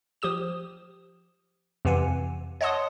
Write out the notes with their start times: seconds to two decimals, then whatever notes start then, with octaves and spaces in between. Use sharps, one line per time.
0.22 F3 G4 D#6 E7
1.85 F2 C3 E3 F#5 G#5
2.61 C#5 D#5 F#5 A5 C6 D#6